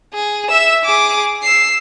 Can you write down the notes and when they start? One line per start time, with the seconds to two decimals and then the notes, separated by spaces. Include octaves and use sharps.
0.14 G#4
0.49 E5 E6
0.84 G#4 D6
1.43 E6 C7